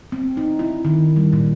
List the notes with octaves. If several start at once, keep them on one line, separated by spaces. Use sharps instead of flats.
C4
D#4
E4
D#3
G3
A#2